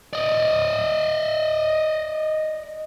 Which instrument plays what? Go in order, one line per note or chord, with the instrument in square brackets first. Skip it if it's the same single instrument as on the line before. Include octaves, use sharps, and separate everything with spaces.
[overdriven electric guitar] D5 D#5